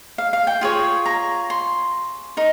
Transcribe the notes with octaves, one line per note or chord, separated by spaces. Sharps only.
F5
F5
G5
F4 G#4 C#5
A#5
C6
D#4 A#4